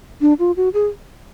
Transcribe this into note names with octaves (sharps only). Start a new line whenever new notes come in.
D4
F4
F#4
G#4